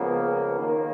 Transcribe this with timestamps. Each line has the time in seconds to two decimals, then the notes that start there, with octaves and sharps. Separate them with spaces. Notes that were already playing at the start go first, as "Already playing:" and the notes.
Already playing: C#2 C#3 F3 A#3 B3
0.57 D#2 D#3 A#3